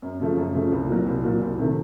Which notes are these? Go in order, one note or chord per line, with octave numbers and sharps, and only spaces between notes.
F#2
C#3 F3 A3
F#2
C#3 F3 A3
C2
A#2 F#3
C2
A#2 F#3
C2
C3 D#3 A3